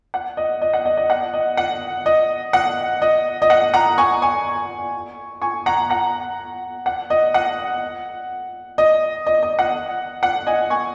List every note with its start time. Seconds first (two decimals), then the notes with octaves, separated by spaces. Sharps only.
0.14 F#5
0.37 D#5
0.62 D#5
0.73 F#5
0.85 D#5
0.97 D#5
1.10 F#5
1.34 D#5
1.57 F#5
2.06 D#5
2.53 F#5
3.02 D#5
3.42 D#5
3.50 F#5
3.74 F#5 A#5
3.98 G#5 C#6
4.22 G#5 C#6
5.42 G#5 C#6
5.66 F#5 A#5
5.90 F#5 A#5
6.86 F#5
7.10 D#5
7.34 F#5
8.78 D#5
9.27 D#5
9.43 D#5
9.59 F#5
10.23 F#5
10.47 D#5 G#5
10.70 G#5 C#6